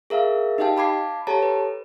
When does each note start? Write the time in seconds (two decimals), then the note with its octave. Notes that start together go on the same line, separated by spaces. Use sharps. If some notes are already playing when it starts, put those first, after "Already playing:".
0.10 G#4 A#4 E5 F5
0.58 D#4 G4 D#5 F5 G5 A5
0.76 F5 A5 B5 D6 G#6 C7
1.27 G4 A4 C#5 A5 A#5
1.42 B4